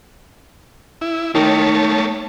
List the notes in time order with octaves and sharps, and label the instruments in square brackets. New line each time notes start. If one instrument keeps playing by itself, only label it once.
[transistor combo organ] E4
[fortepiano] D#3 [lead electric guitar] A3 A#3 [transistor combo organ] C#5 A5